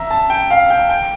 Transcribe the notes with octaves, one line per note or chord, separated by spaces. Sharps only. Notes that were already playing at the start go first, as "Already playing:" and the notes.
Already playing: E5 A#5
A5
G5
F5
G5
G5